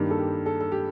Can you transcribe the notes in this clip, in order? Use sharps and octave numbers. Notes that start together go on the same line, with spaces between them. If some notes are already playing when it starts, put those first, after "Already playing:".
Already playing: G2 D#3 G3 A#3
A4
G4
A4
A4
G4